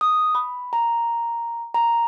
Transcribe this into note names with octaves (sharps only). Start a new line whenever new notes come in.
D#6
B5
A#5
A#5